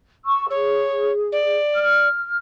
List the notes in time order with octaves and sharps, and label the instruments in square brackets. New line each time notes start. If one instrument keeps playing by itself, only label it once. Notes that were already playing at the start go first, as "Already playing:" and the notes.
[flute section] C#6 E6
[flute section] G#4 [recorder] C#5
[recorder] D5
[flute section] F6